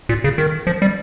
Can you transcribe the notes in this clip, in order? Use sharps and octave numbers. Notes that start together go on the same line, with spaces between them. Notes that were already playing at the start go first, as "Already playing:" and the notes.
A#2
C#3
D#3
F3
G3